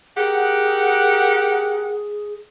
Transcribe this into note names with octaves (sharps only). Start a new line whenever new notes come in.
G4 G#4 A#4 F#5